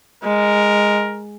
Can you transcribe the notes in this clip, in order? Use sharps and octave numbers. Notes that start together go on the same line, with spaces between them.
G#3 A#4